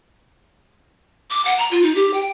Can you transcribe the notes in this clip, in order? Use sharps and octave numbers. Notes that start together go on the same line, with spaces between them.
D6
F#5
A#5
F4
D#4
G4
G5